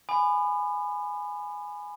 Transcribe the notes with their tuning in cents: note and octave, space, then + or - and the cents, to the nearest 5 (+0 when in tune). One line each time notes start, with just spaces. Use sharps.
G#5 +0 B5 +15 D#6 -45